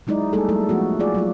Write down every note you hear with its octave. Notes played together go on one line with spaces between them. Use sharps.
F#3 G#3 D#4 E4 D5
G3 A3 A#3 D#4 G#4 A4
F#3 G#3 A#3 E4 A4
F3 A3 B3 F#4
A3 F4 G#4 D5
F#3 G#3 F4